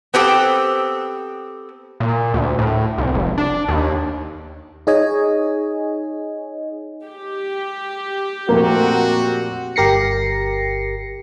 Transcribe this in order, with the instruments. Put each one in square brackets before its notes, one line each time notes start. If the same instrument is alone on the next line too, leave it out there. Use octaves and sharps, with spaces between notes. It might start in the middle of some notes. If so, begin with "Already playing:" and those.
[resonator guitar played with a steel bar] B3 C4 G4 A4
[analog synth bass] A#2
D2
A2
C2
F1
D4
D#2
[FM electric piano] D#4 G#4 C#5 D#5 G#5
[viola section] G4
[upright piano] F2 A#2 A3 [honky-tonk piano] A#3 [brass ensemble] C4 F#4
[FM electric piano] G1 G4 A#4 A#6 C7 C#7